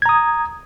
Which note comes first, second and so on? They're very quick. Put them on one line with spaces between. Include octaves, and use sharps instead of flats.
G#6 A#5 D#6